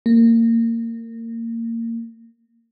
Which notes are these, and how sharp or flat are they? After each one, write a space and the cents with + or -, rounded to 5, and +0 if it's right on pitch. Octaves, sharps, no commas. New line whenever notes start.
A#3 -25